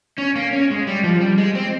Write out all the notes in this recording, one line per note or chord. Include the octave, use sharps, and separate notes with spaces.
C#4
A#3
C#4
G#3
G3
F3
G3
G#3
C4